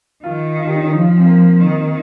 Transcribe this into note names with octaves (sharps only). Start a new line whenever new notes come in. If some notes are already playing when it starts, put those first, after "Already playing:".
D#3 F4
F4
G4
D#4
C#4
F3 D#4
F4
C4
A#3
D#3